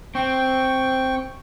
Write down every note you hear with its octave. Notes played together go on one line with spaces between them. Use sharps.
C4 G5 C#6